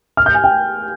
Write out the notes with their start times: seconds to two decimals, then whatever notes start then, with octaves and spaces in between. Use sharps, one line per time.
0.17 F6
0.26 G6
0.34 G#5
0.44 G5